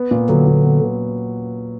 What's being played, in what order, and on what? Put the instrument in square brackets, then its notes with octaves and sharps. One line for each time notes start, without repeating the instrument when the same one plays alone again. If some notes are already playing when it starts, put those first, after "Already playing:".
Already playing: [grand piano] B3
A#2
[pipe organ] D3 [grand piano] F#3
[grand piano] A#2
B3
B3